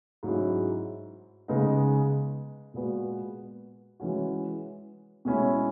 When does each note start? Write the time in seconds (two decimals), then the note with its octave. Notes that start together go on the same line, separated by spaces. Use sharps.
0.23 G#2 F#3 C#4 E4
1.48 C#3 G#3 B3 D#4
2.74 A#2 G#3 B3 F#4
4.00 E3 G#3 C#4 F#4
5.25 B2 G#3 C#4 E4